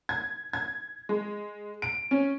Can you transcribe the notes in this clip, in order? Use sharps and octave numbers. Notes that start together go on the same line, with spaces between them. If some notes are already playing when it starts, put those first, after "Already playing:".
G#6
G#6
G#3
D7
C#4